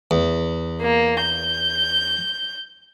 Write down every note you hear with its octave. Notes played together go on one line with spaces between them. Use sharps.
E2
A#3
G6